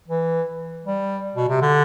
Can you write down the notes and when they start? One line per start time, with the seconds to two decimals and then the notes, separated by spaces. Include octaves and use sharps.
0.08 E3
0.85 G3
1.36 B2
1.48 C3
1.62 D3